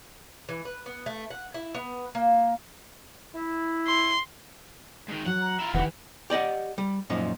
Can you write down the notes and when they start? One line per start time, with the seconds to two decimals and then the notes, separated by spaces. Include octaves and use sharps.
0.49 E3
0.65 B4
0.86 B3
1.06 A3
1.30 F#5
1.54 E4
1.75 B3
2.15 A#3
3.35 E4
3.87 C6
5.08 G#2 D#3
5.26 F#3 F#5
5.41 A#5
5.59 E4 F4
5.74 E1 D#3 E3 G4 B4 F#5
6.30 G4 D5 D#5 F#5
6.78 G3
7.10 F#2 A#2 F3 D#4